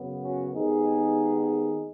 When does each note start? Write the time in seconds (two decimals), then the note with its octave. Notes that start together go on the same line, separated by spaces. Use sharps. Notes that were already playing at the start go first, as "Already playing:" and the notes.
Already playing: F#2 C#3 F#3 B3
0.21 C#4 F#4
0.53 D#2 D#3 G#3 B3 D#4 G#4